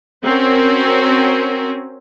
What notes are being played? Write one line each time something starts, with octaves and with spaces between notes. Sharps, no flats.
C4 C#4 F#4 A#4